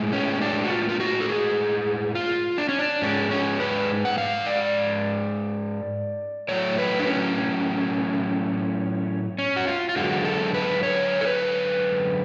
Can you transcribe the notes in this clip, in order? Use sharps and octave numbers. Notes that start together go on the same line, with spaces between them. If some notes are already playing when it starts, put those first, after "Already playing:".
Already playing: A2 G#3
C#4
D4
F#4
F4
F4
F#4
A4
G#4
F4
D4
C#4
D4
G#2 G#3 C#4
C#4
B4
F#5
F5
D5
A2 F#3 A3 C#5
B4
D4
C#4
C#4
F#4
F4
F4
F#2 D3 G#3 F#4
A4
B4
C#5
A4
B4